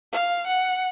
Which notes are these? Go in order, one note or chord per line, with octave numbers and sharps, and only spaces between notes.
F5
F#5